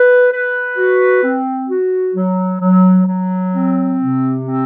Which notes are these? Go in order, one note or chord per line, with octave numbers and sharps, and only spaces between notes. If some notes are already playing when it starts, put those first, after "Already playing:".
Already playing: B4
B4
F#4
C4
F#4
F#3
F#3
F#3
C4
C3
C4